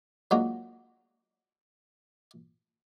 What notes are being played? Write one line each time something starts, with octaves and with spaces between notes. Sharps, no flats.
F#3 G#3 A#3 D4 F4 F#4